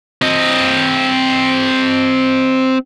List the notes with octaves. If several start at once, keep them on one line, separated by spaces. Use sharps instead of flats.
C4 D#5